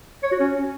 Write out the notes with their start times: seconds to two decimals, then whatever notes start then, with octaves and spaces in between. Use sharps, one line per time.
0.23 C#5
0.31 F#4
0.40 C#4